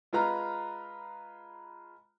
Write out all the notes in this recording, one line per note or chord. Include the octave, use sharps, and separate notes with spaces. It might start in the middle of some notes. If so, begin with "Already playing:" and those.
G#3 F4 B4 A#5 F6